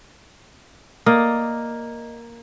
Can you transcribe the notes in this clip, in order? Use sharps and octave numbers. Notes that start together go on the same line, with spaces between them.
A#3 D5 D#5